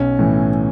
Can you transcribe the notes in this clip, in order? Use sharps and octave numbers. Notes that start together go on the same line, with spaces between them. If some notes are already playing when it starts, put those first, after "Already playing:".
Already playing: B1 C#4
A2 E3